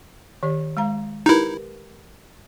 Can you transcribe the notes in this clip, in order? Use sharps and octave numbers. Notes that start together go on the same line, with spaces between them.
D#3 G4 D5
G#3 F5 A#5
D#4 E4 G4 A#4 B4